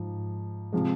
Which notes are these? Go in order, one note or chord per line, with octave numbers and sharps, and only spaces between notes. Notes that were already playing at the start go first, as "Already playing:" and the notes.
Already playing: G#2 F3
C3 F3 G#3